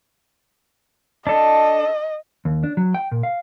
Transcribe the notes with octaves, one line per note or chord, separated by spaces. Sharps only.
D4 A4 D#5
D#2
D4
F#3
G5
A#2
F5